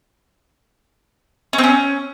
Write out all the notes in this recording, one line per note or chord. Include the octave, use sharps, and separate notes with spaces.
C#4
C4
C#4